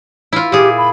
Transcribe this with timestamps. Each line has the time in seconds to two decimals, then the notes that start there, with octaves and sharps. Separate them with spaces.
0.33 E4 F4
0.52 A#2 G4 G#4
0.77 B5